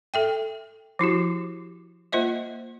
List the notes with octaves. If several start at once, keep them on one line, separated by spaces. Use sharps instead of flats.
A4 E5 G5
F3 E4 F#4 G4
A#3 F4 C5 D#5 E5